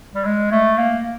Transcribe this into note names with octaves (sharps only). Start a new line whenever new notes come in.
G3
G#3
A3
A#3